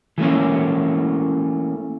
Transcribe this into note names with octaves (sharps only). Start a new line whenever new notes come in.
E3 A3 A#3 C#4